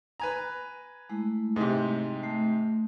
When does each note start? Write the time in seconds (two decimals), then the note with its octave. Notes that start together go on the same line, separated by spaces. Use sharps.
0.20 B4 G#5 A#5
1.09 G#3 A3 E4
1.56 G#2 C3
2.23 A3